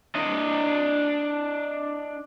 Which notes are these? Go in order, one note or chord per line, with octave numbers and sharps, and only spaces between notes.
D4 D#5